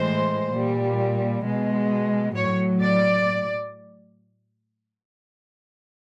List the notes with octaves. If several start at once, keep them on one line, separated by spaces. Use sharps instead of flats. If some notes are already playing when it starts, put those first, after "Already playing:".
Already playing: A2 E3 G#3 C5
A#2 G3
B2 G#3
A2 F#3 C#5
D5